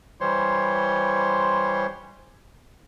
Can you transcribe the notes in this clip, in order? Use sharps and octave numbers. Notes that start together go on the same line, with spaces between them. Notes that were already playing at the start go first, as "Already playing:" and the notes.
E3 G3 C5 C#5 C6